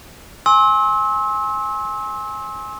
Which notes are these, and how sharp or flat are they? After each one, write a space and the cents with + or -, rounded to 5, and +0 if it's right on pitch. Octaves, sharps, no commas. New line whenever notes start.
G#5 +0 C6 +35 E6 -30